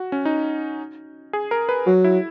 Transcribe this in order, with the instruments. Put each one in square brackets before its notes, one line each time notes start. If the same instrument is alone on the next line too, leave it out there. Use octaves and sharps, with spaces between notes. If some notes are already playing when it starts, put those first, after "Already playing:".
Already playing: [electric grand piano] F#4
C#4
D#4
G#4
A#4
B4
[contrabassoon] F#3 [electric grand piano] F#4
[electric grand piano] E4